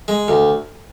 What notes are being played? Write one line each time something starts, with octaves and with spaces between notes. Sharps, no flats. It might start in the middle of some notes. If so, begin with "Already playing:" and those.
G#3
D2